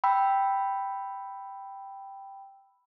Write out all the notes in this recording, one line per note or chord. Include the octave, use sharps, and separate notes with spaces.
G5 B5 E6